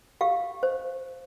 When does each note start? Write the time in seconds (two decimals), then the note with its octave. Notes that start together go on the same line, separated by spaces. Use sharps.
0.21 G4 F5
0.63 C5